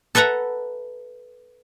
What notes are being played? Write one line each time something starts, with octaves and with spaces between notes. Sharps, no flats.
A4 B4 E5 F#5 A#5